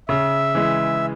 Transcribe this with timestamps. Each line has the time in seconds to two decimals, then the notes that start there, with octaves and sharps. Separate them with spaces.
0.09 C#3 E5
0.55 E3 G#3